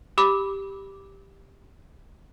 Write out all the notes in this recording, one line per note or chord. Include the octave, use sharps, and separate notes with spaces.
G4 B5 D6